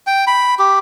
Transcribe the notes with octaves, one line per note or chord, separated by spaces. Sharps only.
G5
B5
G4